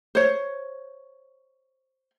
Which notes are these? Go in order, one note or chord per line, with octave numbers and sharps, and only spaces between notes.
C5 C#5